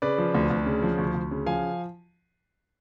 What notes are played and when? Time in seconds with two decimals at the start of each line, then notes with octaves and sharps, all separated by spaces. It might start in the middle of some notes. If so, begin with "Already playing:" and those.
0.02 C#3 B4 D5
0.18 F3
0.34 D2
0.50 D2
0.66 C#3
0.83 F3
0.98 D2
1.14 D2
1.31 C#3
1.46 F3 F5 G#5